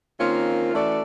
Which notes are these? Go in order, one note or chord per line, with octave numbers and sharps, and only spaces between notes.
D#3 A#3 C4 C#4 F4
E3 A3 C#4 F#4 A4 D5